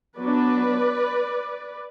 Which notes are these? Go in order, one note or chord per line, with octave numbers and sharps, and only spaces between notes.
F#3 B3 D4 B4 D5